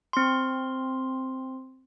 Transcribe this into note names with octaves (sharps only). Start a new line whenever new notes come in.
C4 C6